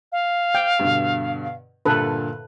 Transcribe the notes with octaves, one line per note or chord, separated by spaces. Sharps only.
F5
G5
G2 B2 D3
G2 A#2 D3 A4 B4